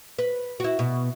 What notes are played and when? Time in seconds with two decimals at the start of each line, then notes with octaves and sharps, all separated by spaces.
0.19 B4
0.60 E4 F#4
0.79 B2